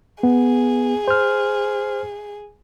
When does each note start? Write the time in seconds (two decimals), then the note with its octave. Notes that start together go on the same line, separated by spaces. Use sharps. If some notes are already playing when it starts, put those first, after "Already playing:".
0.23 B3 G#4
1.08 C5 F6